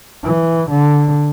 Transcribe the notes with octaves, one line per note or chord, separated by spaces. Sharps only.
E3
D3